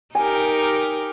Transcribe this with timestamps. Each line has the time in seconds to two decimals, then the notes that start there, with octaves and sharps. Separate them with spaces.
0.15 D#4 G4 A#4 G#5